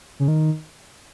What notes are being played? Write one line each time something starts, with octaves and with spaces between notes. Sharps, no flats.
C#3
D#3